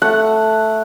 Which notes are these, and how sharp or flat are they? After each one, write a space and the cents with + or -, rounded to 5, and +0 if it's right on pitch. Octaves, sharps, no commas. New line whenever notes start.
A3 +0 F#5 +0